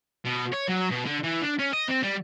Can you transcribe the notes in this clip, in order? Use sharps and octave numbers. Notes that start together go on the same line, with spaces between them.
B2
C#5
F#3
B2
D3
E3
D4
C#4
D#5
C4
G3